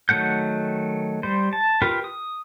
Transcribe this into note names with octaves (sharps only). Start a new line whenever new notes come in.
D#3 F#3 A3 F#5 G6
G3 C5
A5
F4 G4 A#4 B4
D#6